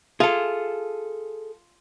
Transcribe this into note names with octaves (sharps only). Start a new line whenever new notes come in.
F4 G#4 A4